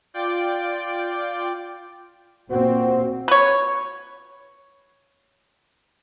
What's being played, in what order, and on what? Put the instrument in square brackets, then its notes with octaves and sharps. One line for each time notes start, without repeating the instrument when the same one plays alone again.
[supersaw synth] F4 D5 G5 D6
[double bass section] A#2 C4 [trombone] F#4
[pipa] B4 C#5